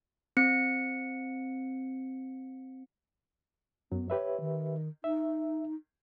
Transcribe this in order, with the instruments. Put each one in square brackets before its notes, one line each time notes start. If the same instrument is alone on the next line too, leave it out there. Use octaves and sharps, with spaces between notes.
[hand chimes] C4 C#7
[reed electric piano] F#2 F#3 [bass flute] B3
[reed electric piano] G4 B4 E5 [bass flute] C#5
[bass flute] D#3
[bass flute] D#4 [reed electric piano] E5